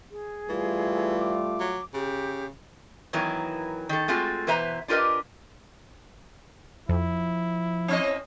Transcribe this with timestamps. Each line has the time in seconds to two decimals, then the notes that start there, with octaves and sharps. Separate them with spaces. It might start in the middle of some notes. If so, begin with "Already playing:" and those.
0.11 G#4
0.49 E3 G3 A3 F4
1.18 D6
1.60 F#3
1.94 C#3 G4
3.13 D#3 E3 F#3 B3 E4 A#4
3.89 D#3 A4
4.08 G#3 A3 C4 F4 F#4 A4
4.47 B2 E3 B4 C5 E5 A#5
4.88 D4 F4 G4 A#4 B4 D#5
6.89 F2 F3 E4
7.88 C4 C#4 D#5